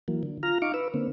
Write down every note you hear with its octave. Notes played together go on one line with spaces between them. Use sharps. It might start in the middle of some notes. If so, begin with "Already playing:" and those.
E3 F#3 A#3
D3
F4 A#5 F6
D#4 F5 C#6 D6
B4 E6
D3 A#3 C4